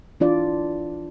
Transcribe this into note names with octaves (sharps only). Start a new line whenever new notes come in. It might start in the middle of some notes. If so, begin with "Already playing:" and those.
E3 D4 F4 D5